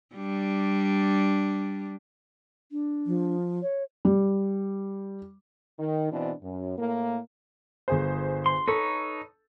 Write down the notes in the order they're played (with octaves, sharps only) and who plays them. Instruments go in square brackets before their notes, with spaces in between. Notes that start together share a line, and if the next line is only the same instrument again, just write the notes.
[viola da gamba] G3 D4
[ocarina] D4
[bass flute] F3
[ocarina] C#5
[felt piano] G3
[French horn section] D#3
B2 E3 C4 D4
F#2
A2 A#3
[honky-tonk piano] G1 G#4 C5
[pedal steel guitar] C6
[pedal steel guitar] D#4 B4 C#5 [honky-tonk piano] A4